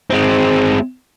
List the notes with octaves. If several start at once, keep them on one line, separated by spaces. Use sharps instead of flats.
G#3 C4